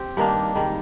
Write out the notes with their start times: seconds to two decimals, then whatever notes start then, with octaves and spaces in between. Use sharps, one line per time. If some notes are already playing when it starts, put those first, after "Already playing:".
Already playing: C4 G4
0.17 G2 D#3 A#3 D4
0.55 G#2 D#3 G3